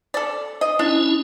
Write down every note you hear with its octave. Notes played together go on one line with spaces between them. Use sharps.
A4 D5
D#5
C#4 D4 E4